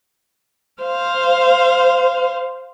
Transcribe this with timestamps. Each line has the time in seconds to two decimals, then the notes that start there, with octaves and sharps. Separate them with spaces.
0.83 C5 F5